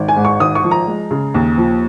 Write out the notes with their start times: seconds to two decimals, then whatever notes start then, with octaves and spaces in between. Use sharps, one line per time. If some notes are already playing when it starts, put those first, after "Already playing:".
Already playing: G#1
0.08 G#5
0.16 G#2
0.25 C#6
0.40 G#1 D#6
0.55 C#6
0.63 F3
0.71 A#5
0.87 G#3
1.11 C#3
1.34 D#2
1.57 F3